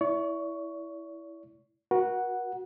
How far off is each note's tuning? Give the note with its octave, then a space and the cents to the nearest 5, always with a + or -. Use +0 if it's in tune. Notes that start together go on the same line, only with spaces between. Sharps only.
E4 +0 D5 -40 C#6 +10
F#4 +0 A#4 +45 F#5 +0